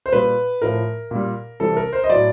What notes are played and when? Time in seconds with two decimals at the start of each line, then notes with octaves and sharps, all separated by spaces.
0.06 C5
0.13 A#2 G3 B4
0.62 A2 F3 A#4
1.11 A#2 G3
1.60 C3 E3 G3 A4
1.77 A#4
1.93 C5
2.04 D#5
2.10 A2 F#3 D5